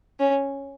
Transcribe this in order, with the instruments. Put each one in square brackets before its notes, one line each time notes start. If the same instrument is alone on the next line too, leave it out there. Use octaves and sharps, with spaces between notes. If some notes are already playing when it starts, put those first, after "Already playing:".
[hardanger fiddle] C#4